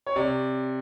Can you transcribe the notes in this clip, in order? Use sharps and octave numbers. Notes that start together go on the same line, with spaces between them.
C#5
C3 D5